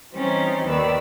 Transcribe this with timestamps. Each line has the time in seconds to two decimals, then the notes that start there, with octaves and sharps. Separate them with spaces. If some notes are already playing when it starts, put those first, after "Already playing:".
0.13 E3 G3 C4 C#4 D#4
0.65 D#2 D#3 B4 D5 E6